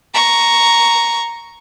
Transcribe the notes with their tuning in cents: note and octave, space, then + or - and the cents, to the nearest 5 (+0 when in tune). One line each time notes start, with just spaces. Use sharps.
A#5 +0 C#6 +0